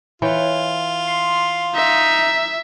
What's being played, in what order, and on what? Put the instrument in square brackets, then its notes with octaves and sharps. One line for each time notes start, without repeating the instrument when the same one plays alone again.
[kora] E3 C#5 G5 [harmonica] F4
[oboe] C6
[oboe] D#4 [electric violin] E5